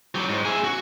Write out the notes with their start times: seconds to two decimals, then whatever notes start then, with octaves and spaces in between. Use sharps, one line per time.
0.15 F#3 G4
0.29 G#2
0.45 G#4 E5
0.64 F#4